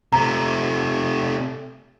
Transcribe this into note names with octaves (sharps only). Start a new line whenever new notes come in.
C3 A3 A#5